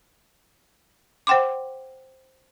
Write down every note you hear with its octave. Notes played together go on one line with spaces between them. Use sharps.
C5 F#5 G5 C6 D6